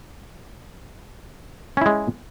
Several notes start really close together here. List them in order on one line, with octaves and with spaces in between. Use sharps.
C#4 E4 G#3